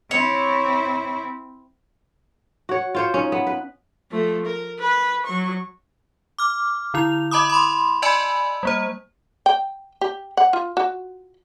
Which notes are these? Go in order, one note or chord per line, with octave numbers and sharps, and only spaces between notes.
C4 E4 C#5
F#4 C#5
F4 C5 C#5
C#4 D#4
B3
B4
F3 A3
A#4
B4
F#3 C#6
D6 F6
D3 E4 F7
D#5 A5 B5 D6 D#6
B5 C6
D5 D#5 G#5 A5 B5 E6
G3 A#3 C5
G5
G4
F#5
F4
F#4